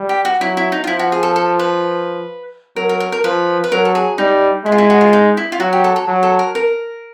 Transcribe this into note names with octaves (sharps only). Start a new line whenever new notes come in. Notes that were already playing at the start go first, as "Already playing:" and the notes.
Already playing: G3
G4
F#4
F#3 E4
E4
D#4
F4
F3 E4
F#4
G#4
A4
A4
B4
F#3 A#4
A#4
A#4
A#4
F3 B4
B4
F#3 A#4
A4
G#4
G3 D#4
G#3 E4
F4
E4
F#4
F4
D#4
E4
F4
F#3 F#4
G4
A4
A4
F#3
A4
A#4
A#4